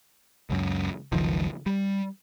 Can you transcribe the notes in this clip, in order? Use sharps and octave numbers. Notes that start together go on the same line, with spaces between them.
C#2 F#2
F#1 C#2 D#3 F3
G3